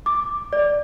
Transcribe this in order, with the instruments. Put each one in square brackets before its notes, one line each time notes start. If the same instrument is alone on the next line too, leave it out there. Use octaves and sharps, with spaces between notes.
[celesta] D6
D5